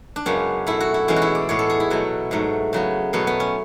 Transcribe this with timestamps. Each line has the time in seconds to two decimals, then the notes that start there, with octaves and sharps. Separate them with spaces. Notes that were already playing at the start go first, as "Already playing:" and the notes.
0.16 D4
0.26 F#2 C#3 G#3 B3 C#4
0.67 B2 A3 E4
0.80 F#4
0.94 E4
1.08 E2 B2 G#3 B3 C#4
1.16 F#4
1.22 E4
1.35 D5
1.49 A2 G#3 B3 C#5
1.59 A4
1.70 G#4
1.80 E4
1.90 B2 F#3 A3
2.31 G#2 F#3 A3
2.73 C#3 F#3 B3
3.13 B2 F#3 A3 B3
3.27 B3
3.40 C#4